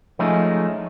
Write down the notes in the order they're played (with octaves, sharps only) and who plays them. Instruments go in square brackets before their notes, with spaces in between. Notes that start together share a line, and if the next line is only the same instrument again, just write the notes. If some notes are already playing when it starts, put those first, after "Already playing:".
[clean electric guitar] F3 G#3 A3 C#4 D#4